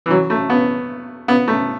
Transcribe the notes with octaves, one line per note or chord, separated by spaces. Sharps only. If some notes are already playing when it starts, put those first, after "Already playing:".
E3
F#3
A3
B3
B3
A3